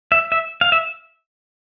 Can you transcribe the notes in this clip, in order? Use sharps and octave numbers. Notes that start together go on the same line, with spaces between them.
E5
E5
F5
E5